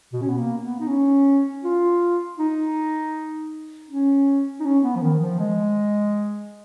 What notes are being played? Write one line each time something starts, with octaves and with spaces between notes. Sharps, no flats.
B2
C#4
B3
A#3
B3
D#4
C#4
F4
D#4
C#4
D#4
C#4
B3
F3
D#3
F3
G#3